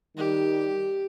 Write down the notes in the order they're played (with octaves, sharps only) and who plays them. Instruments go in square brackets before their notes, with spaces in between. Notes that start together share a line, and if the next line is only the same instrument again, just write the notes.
[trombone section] D#3 G3 [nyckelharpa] G4